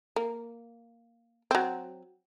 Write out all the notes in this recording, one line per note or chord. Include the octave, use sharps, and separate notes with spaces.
A#3
F#3 C4